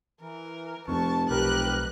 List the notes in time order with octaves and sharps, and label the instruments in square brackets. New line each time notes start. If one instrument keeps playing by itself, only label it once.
[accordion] E3 [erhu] A#4
[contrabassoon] F1 [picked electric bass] F2 [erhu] A5 [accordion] C#6
[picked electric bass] B1 [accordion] G4 A#4 B4 [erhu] F#6